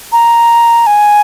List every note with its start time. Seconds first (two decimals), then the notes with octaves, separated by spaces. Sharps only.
0.12 A#5
0.87 G#5